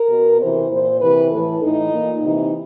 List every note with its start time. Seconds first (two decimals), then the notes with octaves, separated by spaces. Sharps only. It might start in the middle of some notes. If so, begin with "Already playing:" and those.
Already playing: A#4
0.09 B2
0.40 C3 E3 C5
0.70 A#2 C5
1.00 C3 E3 B4
1.31 A2 E3 A4
1.62 A2 E3 D#4
1.92 A#2
2.23 C3 E3 D#4